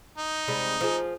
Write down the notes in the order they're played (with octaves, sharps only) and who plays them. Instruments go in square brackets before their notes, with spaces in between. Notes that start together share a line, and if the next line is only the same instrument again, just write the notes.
[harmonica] D#4
[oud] C3 G3 G#3
F3 G#4